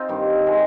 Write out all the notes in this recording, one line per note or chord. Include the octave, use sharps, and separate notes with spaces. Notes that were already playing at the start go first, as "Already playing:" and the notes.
Already playing: C4 D#4 F4
G2 D#3 G3
C3 D#3 G#3